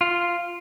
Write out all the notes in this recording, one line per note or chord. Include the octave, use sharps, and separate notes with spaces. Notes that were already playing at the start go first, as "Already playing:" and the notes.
F4